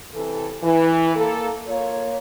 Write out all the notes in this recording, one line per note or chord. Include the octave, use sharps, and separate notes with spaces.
C3 E3 A4
E3
A#3 A4
A#3 F4 C#5